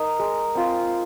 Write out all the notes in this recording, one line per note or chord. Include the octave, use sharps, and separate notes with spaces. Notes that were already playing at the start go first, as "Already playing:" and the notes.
Already playing: D#4 A#4 D#5
G#3
C4 F4